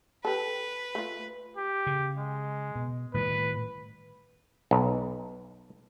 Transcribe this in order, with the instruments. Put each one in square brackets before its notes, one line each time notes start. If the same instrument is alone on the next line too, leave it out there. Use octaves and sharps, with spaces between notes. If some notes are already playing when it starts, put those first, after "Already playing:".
[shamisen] G4 A4 [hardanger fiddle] B4
[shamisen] A3 F4
[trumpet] G4
[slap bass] C#3
[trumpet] G#3
[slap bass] B2
[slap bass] A2 D#3 G3 [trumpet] B4
[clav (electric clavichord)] B1